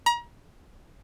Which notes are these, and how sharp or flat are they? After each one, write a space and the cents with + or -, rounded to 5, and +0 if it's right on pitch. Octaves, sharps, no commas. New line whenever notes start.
A#5 +35